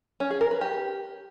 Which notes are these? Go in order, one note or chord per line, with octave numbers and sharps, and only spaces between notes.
C#4
G#4
A#4
B4
G4